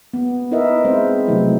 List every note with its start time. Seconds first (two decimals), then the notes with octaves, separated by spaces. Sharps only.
0.14 B3
0.51 D#4 E4 A#4 B4 D#5 E5
0.85 G#3 C4 C5 E5
1.28 C3 F3 F#3 A3 E4